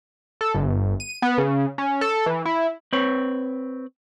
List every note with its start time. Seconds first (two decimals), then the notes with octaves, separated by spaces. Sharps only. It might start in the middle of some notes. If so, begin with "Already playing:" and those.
0.41 A4
0.55 G1
1.00 D#7
1.22 B3
1.38 C#3
1.78 C#4
2.01 A4
2.26 E3
2.45 E4
2.93 C4 B4 C#5